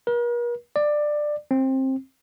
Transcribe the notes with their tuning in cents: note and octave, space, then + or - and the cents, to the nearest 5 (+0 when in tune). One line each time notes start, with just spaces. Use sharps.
A#4 +45
D5 +15
C4 +20